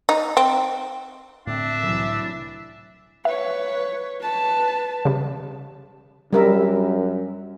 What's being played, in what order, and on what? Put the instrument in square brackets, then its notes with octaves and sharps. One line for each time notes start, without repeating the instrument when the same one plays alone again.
[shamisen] D#4
C4
[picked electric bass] A2 D3 C4 [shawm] D4 [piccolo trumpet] E5
[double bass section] C2 E3 F#3
[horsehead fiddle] B4 C#5 [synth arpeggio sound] E5
[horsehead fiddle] B4 A5
[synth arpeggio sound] C#3 G3
[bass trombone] F#2 [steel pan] G3 A#4 E5